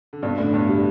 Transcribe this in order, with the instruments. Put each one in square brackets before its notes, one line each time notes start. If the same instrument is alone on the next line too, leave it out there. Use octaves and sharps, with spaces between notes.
[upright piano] D3
[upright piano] G2 B2 [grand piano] D4
[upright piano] A2 D3 [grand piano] D4
[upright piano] G2 B2 [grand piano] D4
[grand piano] G3